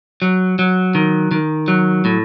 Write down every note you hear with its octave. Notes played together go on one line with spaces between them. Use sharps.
F#3
F#3
D#3
D#3
F#3
A2